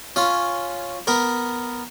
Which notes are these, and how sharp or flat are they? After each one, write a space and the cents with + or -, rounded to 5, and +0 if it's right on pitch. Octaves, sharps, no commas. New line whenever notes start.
C#4 +0 F4 +0
B3 +0 A#4 +0